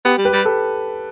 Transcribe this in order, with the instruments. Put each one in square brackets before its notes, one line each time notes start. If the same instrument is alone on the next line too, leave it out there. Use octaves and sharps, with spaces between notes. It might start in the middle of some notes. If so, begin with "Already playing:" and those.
[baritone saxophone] B3 [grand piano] G4
[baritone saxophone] G3
[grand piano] G4 B4
[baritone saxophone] G3
[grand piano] A4